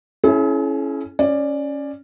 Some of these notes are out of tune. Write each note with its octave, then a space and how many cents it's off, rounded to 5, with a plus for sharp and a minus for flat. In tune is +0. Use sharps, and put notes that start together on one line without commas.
C#4 -10 E4 +0 G#4 +45
C#4 +0 D5 +10